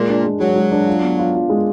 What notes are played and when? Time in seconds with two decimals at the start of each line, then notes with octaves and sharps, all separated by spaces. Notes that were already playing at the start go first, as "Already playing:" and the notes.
Already playing: A#2 G#3
0.09 D4
0.24 G#3
0.40 F#3 G#3
0.56 G#3
0.72 D4
0.87 F4
1.03 B3
1.19 F4
1.34 F4
1.50 G#3